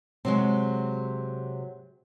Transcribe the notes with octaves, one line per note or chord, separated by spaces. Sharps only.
C3 F#3 G#3